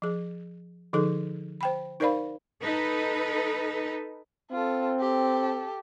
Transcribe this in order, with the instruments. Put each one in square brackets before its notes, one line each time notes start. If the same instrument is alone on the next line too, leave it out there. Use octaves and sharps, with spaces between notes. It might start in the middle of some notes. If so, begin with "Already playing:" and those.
[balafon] F3 G#4
D3 F3 D#4 G#4 A4
C5 G5 B5
D#4 A#4 C5 D5 F5 B5
[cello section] D#4 A4 B4
[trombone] C4 [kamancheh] F4 A4
[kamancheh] G4 A4